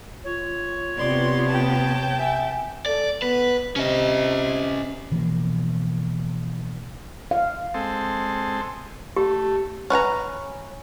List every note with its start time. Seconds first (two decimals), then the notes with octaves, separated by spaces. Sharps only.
0.24 F4 C#5
0.97 C3 B3 D5 C6
1.49 G5 A5
2.18 E5 G#5
2.86 A4 D5
3.22 B3 B4
3.76 C3 C#4 D#5
5.11 B2 E3 F3 A#3
7.31 F5
7.74 G#3 C4 A4
9.16 A3 G4
9.90 C#4 B4 F#5 A#5